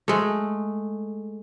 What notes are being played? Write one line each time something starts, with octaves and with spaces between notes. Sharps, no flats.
G#3 A3